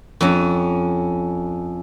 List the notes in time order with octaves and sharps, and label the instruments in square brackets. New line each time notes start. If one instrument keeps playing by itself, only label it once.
[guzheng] F2 C#4